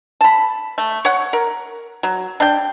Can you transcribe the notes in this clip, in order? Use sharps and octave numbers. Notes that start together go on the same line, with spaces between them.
A5 B5
A3
C#5 F#5
A#4
F#3
D4 G5